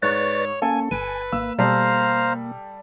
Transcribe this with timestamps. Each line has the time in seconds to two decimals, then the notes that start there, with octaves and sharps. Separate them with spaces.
0.02 G#2 B4 C#5 D5 C#6 A6
0.62 A#3 C#4 A4 G#5
0.91 G1 B4 G#5
1.32 G#1 A#3 E6
1.59 B2 G3 A4 C5 F5 A#5